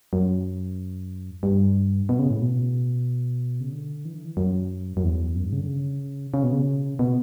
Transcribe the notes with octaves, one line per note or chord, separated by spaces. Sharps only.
F#2
G2
B2
C#3
A2
B2
C#3
D3
E3
D3
E3
F#2
F#2
E2
F#2
G2
C#3
D3
C#3
C#3
B2
C#3
B2